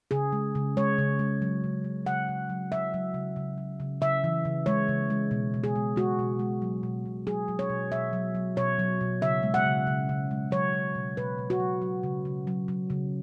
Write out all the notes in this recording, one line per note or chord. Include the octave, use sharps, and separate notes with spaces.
C#3 G#4
G#3
C#3
G#3 C#5
C#3
G#3
F#3
C#3
C#3
C#3 F#5
C#3
F#3
F#3 E5
F#3
C#3
C#3
F#3
C#3
C#3 E5
E3
C#3
G#3 C#5
C#3
G#3
B2
B2
G#4
G#3
G#3 F#4
B2
G#3
F#3
B2
B2
F#3 G#4
F#3
C#5
B2
B2 E5
F#3
F#3
B2 C#5
F#3
B2
C#3 E5
G#3
F#5
C#3
C#3
C#3
G#3
F#3 C#5
F#3
B2
B2 B4
B2
F#4
F#3
F#3
C#3
C#3
F#3
F#3
C#3